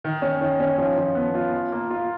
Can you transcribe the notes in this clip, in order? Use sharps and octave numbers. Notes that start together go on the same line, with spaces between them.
D#3
C#4
D#3
C#4
F3
F3
B3
F4
F4
A#3
F4